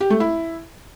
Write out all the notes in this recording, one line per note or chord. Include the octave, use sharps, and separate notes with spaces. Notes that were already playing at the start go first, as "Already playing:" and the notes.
G4
A3
E4